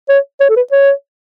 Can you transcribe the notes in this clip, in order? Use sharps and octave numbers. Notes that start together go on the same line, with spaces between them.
C#5
C#5
A4
B4
C#5